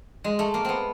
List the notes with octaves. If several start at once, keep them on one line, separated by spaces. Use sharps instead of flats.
G#3
A3
A#3
B3 C4